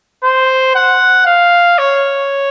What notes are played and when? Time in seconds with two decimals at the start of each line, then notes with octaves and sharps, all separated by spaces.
0.24 C5
0.75 F#5
1.26 F5
1.78 C#5